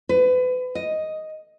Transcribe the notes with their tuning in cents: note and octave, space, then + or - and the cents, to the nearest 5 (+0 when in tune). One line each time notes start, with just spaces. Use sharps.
B4 +35
D#5 +5